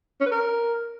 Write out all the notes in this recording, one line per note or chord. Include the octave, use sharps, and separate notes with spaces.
C#4
B4
A#4